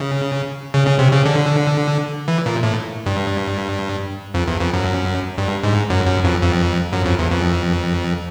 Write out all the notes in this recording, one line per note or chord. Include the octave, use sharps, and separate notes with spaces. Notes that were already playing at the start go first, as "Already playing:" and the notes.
Already playing: C#3
C#3
C#3
C3
C#3
D3
E3
A#2
A2
G2
F2
E2
F2
F#2
G2
G#2
F#2
F#2
F2
F2
F#2
F2
E2
F2